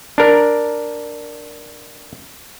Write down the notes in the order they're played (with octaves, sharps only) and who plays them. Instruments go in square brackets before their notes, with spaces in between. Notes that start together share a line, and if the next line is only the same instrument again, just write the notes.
[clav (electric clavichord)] D4 A#4